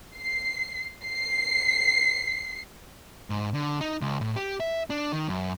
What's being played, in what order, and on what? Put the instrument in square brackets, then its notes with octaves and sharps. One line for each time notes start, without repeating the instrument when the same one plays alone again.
[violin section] C7
C7
[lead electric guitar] G#2
D3
D#4
C#2
A2
G4
E5
D4
D#3
F#2